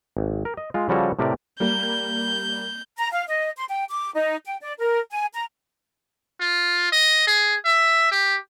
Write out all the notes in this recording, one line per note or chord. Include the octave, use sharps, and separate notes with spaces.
G#1
A#4
D#5
G#3 F4
C#3 F3 G3 F#4 A4 C#5
A2 C3 G4 A#4 D5
G3 A#3 G6
A#5
F5
D#5
C6
G5
D6
D#4
G5
D5
A#4
G#5
A#5
F4
D#5
G#4
E5
G4